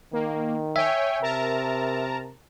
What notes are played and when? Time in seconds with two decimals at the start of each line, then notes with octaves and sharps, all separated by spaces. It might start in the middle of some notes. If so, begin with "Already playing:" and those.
0.13 D#3 A#3
0.76 C#5 E5 G5 G#5
1.22 C3 A#4 A5 A#5